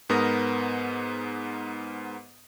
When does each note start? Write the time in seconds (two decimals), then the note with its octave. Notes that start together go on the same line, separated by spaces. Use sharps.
0.09 G#2 B3 A#4 D#6 A#6